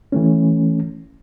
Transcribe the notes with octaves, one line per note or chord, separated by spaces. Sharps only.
E3 A3 C#4